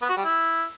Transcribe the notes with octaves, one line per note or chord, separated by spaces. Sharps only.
B3
F#4
G3
E4